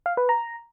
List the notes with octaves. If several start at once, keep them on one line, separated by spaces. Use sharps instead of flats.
F5
B4
A#5